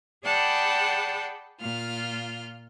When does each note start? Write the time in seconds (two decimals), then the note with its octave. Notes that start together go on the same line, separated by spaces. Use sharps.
0.23 G#4 D5 F#5 G5 A5 B5
1.61 A#2 F4 F6